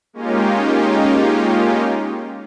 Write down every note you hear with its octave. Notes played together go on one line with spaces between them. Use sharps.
G#3 A#3 C#4 D#4 F4 G4